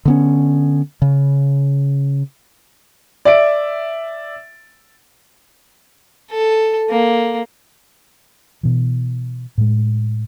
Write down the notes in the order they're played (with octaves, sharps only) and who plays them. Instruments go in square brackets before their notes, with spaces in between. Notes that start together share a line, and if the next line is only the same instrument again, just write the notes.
[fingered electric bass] D3 B3 C#4
C#3
[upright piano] D5 E5 D7
[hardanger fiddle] A4
A#3
[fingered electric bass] B2 E3
A2 G#3